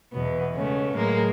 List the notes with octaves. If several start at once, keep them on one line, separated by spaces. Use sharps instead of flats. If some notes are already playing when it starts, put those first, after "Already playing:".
E2 B2 B3
C#3 G#3 A3 B3 C#4
A2 F#3 G#3 A#3